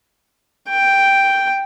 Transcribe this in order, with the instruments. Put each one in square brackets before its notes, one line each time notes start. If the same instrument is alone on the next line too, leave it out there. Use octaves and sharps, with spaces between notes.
[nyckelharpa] G5